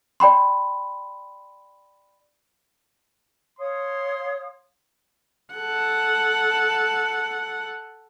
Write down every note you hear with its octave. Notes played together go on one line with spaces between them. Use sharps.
D5 G5 B5 C6
C#5 F5 C6 D#6
A4 F#5